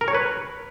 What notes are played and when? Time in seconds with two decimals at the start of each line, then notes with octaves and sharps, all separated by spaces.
0.01 A#4
0.08 C#5
0.15 B4